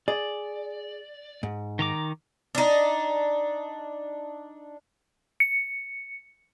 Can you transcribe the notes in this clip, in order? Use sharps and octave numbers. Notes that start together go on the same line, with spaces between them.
G#4 D5
G#2
D#3 A#5 D6
D4 D#4
C#7